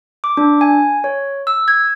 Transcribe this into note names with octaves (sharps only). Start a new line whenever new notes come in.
D6
D4
G#5
C#5
E6
G#6